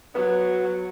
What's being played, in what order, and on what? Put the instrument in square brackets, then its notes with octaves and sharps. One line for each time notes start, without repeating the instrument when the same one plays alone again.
[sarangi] F#3 [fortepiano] B3